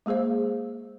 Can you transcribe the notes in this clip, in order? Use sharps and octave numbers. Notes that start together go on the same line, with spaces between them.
G#3 A#3 G#4 C5 F5